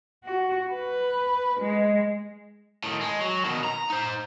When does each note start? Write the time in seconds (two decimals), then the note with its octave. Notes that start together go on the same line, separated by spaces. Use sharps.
0.25 F#4
0.72 B4
1.61 G#3
2.84 A2 D#3
3.01 G#3
3.21 F#3
3.45 B2 D#3
3.64 A#5
3.90 D#4 C5